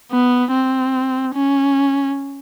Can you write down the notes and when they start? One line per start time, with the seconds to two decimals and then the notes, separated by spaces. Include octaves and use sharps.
0.11 B3
0.52 C4
1.34 C#4